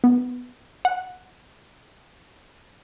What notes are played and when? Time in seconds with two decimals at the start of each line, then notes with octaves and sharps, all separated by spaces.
0.04 B3
0.85 F#5